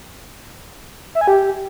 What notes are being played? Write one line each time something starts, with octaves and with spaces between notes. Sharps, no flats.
E5
G#5
G4